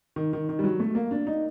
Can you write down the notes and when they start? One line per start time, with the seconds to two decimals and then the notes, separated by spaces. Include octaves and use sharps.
0.16 D#3
0.33 D#3
0.49 D#3
0.59 G3
0.64 F#3
0.80 A3
0.95 A#3
1.11 D4
1.27 D#4